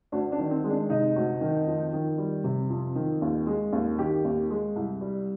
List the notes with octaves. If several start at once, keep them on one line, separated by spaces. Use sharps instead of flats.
D2 D4
D4
D#3
C4
G#3
D4
C3 D#4
D2
D#3
F2
D#3
G3
C3
F2
D#3
D#2
G#3
D#2
D#3 G4
D#2
G#3
C2
G3